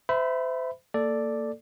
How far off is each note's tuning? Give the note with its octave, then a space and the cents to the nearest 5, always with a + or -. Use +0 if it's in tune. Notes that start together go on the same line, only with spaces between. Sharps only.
C5 -35 E5 +0 B5 +0
A#3 -25 A4 +0 D5 +0